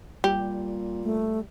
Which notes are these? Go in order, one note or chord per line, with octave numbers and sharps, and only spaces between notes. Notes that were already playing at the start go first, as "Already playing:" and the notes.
A#2 G3 G4
A3